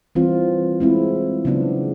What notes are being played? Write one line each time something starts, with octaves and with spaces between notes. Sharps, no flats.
E3 G3 C4 F4
G#3 C4 E4
C#3 F#3 B3 D4